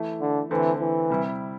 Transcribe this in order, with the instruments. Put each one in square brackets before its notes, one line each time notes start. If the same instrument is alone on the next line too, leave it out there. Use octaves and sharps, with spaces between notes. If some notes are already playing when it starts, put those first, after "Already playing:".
Already playing: [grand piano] E3 A3 E4
[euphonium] D3
[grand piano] D3 A3 C4 E4 [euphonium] E3
[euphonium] E3
[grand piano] C3 G3 E4